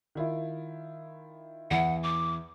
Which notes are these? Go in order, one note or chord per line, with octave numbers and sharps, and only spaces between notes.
D#3 E4 F4
E2 E4 F#5
D6